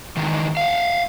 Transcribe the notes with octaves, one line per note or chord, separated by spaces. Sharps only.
D#3 E3 G#3 D#4
F5 F#5